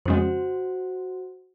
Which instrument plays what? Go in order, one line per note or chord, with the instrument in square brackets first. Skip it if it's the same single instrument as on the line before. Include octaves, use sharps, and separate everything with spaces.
[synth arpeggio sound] F2 C#3 G#3 [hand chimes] F#4 C5